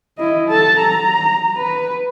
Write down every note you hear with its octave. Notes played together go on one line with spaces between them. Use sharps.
E4 D#5
A4 A5
A#5
B4